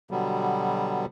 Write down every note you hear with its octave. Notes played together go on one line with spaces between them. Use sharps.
B2 D3 F#3 G3 B3